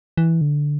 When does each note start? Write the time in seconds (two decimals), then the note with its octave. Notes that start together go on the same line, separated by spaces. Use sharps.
0.17 E3
0.41 D3